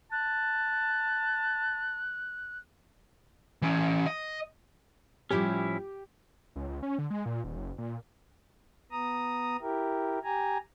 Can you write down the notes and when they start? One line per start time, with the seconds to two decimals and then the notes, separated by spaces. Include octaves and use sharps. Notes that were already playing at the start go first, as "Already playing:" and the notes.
0.12 A5 F#6
3.62 E3 C#4
4.06 D#5
5.31 A2 F3 G3 C#4 E4 G4
6.56 C#2
6.68 C#2
6.83 C#4
6.98 D3
7.11 G#3
7.26 A#2
7.44 D#1
7.56 F#1
7.78 A#2
8.91 B3 A#5 D#6
9.62 E4 G4 A#4
10.24 G4 G#5 A#5